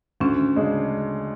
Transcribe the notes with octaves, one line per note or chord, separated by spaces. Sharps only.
D2 C#4
C#3 G#3 D4